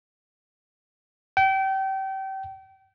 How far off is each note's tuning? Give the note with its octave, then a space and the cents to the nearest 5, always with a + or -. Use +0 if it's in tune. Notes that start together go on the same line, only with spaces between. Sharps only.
G5 -30